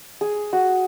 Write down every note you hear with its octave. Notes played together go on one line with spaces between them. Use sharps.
G#4
F#4